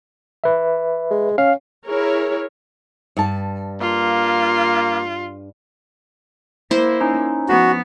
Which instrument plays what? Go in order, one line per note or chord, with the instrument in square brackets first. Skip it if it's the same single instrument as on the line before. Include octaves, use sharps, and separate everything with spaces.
[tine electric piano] B4 E5
[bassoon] G#3
[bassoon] C#4 [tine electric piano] F5
[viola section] E4 G#4 A#4 C#5
[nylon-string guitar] G2 A5
[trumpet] A#3 [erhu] F4
[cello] A#3 [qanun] E4 C5
[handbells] C#4 D#4
[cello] F3 B3 [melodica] F#4